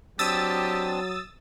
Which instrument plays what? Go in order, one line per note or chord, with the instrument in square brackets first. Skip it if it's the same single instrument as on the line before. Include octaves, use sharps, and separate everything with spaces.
[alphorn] F#3 [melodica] C4 D4 [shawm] G4 [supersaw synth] D#6 E6 A6